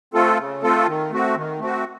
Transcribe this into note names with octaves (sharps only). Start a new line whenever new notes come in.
A3 C4 F4 A4
C#3
A3 C4 F4 A4
D#3
A3 C4 F#4
D#3
A3 C4 F#4